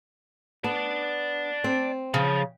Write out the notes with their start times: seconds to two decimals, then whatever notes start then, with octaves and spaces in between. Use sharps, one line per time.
0.64 B3 D5 A5
1.64 C4
2.14 C#3 F3